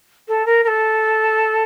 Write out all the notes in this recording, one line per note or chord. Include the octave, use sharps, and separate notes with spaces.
A4
A#4
A#4
A4